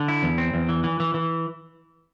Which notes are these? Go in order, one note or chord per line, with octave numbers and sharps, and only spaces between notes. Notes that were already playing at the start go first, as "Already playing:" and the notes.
Already playing: D3
E4
E2
C4
E2
E3
E3
E3
E3